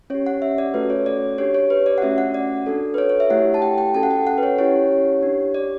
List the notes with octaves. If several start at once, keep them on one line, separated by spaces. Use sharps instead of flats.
C#4 G4 C#5
F#5
E5
D5
A3 C#4 F#4 A4 B4
C#5
D5
D4 G4 C#5
C#5
B4
D5
F#5
A3 C#4 F#4 E5
F#5
D5
D4 F#4 A4
B4
C#5
C#5
E5
A3 E4 G4 F#5
A5
G5
G5
C#4 F#4 A4 A5
F#5
G5
F#5
B4
C#5
C#4 E4 G4 C#5
D4 G4
D5